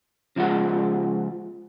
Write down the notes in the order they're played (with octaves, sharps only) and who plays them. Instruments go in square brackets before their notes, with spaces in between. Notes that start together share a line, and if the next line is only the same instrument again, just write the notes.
[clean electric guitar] C#3 F3 G#3 F#5